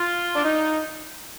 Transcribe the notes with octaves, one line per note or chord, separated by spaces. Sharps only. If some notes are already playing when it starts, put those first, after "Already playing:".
Already playing: F4
D4
D#4